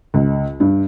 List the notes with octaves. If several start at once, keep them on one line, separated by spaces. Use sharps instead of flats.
C#2
G2